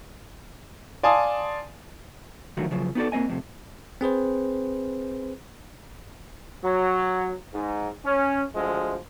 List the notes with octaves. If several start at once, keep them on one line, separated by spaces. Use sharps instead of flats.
D5 F5 G#5 A5 C6 D#6
D3 D#3 F3 F#3 A3 F#4
C#3 F3 F#3
B3 D#4 F#4 A4 D5
A#3 C4 D#5 G#5
F2 A2 C3
C4 G#4 B4 C5
F#3
G#2
C#4
D2 F3 G#3